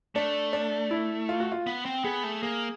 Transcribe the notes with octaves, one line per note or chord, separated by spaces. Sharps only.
A3 D4
D4
E4
F4
F#4
F4
B3
C4
B3 G#4
A3
A#3 G#4